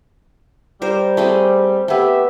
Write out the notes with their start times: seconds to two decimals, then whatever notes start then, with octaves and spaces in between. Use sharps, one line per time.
0.82 G3 A#4 C5
1.17 A3 C4 G#4
1.88 A3 B3 G4 E5